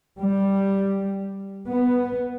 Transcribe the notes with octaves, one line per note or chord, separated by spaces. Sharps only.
G3
B3